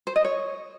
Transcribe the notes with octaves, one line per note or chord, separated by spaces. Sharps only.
C5
D#5
C#5